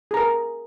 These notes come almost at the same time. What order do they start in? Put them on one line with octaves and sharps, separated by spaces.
G#4 A#5 A#4